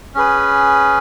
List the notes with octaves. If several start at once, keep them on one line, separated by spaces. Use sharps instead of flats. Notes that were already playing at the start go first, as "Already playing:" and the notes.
C#4 G#4 B4